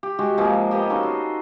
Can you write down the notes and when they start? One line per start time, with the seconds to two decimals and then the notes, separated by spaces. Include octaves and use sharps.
0.03 G4
0.19 G#3 F#4 G4
0.38 F3 G#3 A#3 C4
0.71 A#3 B3 G4 D#5
0.90 C#4 D#4 F#4 A4
1.03 C6